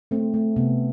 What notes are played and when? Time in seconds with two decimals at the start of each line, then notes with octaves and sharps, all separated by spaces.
0.11 A3 C4
0.34 A3
0.56 C3 B3